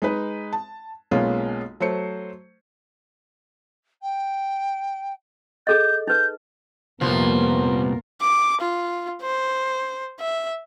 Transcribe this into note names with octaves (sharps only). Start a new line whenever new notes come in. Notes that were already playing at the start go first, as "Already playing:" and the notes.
G#3 D#4 B4
A5
B1 G#3 A#3 B3 C#4 F4
F#3 A3 C5 C#7
G5
G#4 A4 D#5 G6
D#4 B4 G6
C2 F2 A#2 F3 B3 A#4
D6
F4
C5
E5